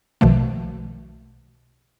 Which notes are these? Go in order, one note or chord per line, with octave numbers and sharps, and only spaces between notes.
B1 B2 D#3 F3 A3